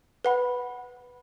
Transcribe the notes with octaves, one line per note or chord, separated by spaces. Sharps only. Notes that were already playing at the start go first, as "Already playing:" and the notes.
B4 F#5 B5